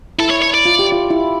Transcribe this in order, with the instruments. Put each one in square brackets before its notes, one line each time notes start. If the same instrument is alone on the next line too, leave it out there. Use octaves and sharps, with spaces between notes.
[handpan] E4 [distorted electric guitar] A4
[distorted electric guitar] C#5
C#5
D5
[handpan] F4
G4
F4
E4